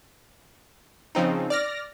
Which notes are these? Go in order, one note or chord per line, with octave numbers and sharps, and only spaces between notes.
C#3 F3 C4 D#4
D5 F6 A#6